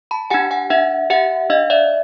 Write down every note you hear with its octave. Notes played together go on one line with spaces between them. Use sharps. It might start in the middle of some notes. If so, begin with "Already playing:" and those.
A5 B5
D4 G4 F#5 G#5
F#5 G#5
D4 E5 F#5
G4 E5 F#5
D4 D#5 F5
D5 E5